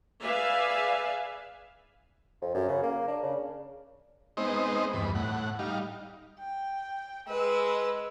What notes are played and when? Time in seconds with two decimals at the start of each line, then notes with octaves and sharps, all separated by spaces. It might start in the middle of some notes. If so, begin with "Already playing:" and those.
0.21 G#4 B4 D5 E5 F5 G#5
2.42 F2
2.55 F#2
2.68 C#3
2.83 A#3
3.08 D4
3.23 C#3
4.37 G#3 B3 C4 D#4 C5 D#5
4.93 E2 G2 B5
5.15 A2 F#5
5.59 G3 D#4 F5
6.39 G5
7.28 G#3 B4 E6